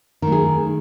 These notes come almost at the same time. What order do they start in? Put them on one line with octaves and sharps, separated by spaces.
D#3 A3 G#4